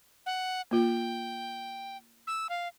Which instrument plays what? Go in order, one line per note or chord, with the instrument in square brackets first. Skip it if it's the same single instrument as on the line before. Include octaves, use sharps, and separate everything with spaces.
[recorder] F#5
[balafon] A#3 F4 [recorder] G5
[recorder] E6
F5